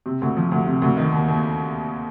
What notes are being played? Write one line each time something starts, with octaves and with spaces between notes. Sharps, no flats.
C3
D2
F3
D2
C3
D2
D#3
D#2
D#2